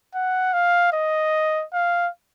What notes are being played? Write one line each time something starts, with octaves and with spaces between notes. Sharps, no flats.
F#5
F5
D#5
F5